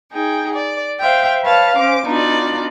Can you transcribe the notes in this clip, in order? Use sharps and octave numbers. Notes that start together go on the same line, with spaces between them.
D#4 G#4 G5
D5
C5 E5 F5 G5
B4 C#5 F5 A5
C#4 C5 D6
B3 D4 D#4 F4 F#4 D5